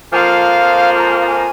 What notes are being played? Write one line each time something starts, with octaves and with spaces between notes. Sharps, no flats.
F2 F3 A#3 F5 G#5
A#5
G#5
F5
G#5